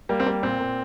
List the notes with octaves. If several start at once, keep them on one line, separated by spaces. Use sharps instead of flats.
G3 A#3
C4
G3 A#3
A#2 C4
A#2